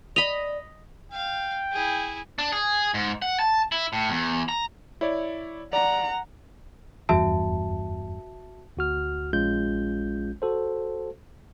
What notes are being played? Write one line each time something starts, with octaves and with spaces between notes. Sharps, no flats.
D5 D#5 B5 F7
F5 G5
E4 G#4
D4
G#4
G#2
F#5
A5
E4
A2
E2
A#5
E4 C#5 D5
D5 F#5 A#5
F1 E2 G2 F#4 E5 A5
D2 F#4 F6
A#1 G#3 C#4 F4 G6
F#4 A4 C5